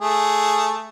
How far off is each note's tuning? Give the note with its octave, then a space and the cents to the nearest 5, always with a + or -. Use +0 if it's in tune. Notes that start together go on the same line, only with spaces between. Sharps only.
A3 +0 G#4 +0